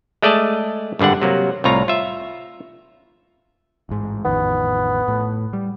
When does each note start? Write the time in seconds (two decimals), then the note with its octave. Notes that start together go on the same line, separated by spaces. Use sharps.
0.22 G#3 A3 D5 D#5 A5
0.99 G#1 G2 D3 D4 F#5
1.22 C3 F#3 A#3
1.64 C2 A2 F4 C#5 A#5
1.88 F4 E5
3.89 A1 G#2
4.25 A1 F2 D#3 B3
5.08 A2
5.53 G3